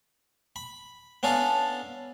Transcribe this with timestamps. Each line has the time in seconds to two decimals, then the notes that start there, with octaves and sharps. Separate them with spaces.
0.56 B5
1.23 B3 C#4 D4 A4 F5